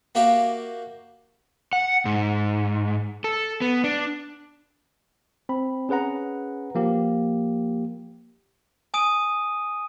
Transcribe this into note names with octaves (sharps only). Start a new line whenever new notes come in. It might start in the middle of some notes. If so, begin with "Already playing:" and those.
A#3 F#4 G4 E5 F5 G5
F#5
G#2
A4
B3
D4
C4 B5
C#4 G#4 B4 F#5 A#5
F3 A#3 G4
G#5 D#6 D7 D#7